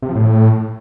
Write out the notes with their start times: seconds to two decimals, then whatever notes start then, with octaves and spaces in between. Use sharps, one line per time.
0.02 C3
0.09 F3
0.15 A2